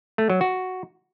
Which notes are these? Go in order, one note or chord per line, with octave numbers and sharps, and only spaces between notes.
A3
F#3
F#4